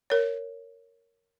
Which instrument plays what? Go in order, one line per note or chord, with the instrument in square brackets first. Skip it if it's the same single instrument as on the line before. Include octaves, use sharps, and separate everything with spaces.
[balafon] A#4 C#5